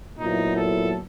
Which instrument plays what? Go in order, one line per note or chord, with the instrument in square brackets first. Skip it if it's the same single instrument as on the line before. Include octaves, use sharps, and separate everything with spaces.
[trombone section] A#2 F#3 B3 E4 [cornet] D#4
[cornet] A4